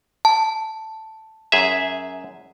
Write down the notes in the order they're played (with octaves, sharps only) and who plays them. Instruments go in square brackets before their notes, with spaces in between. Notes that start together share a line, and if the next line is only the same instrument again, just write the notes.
[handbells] A5
[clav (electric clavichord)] F#2 G#4 E5